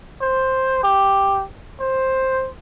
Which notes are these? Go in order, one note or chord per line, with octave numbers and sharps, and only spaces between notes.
C5
G4
C5